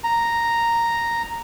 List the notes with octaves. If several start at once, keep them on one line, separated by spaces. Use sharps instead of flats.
A#5